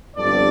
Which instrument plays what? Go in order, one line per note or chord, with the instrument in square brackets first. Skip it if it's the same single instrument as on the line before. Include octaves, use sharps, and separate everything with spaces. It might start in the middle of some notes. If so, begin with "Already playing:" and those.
[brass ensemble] G1 G2 F3 C4 A4 D5